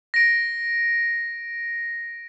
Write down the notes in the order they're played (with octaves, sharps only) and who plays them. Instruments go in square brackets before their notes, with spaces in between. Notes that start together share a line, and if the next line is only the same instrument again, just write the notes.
[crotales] A#6 D7